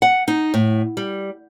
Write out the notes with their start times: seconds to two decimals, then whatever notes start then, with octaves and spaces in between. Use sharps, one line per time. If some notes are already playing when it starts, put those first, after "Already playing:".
0.02 F#5
0.28 D#4
0.54 A2
0.97 G3